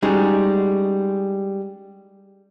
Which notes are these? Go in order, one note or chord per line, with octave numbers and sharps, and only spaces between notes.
G3 G#3 C#4 D#4 F#4 G#4